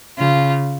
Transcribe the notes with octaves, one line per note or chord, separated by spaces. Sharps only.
C#3 F4